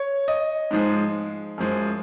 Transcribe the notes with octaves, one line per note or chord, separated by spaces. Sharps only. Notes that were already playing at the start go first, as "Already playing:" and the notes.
Already playing: C#5
D#5
G#2 F3 G#3
F#2 F3 G#3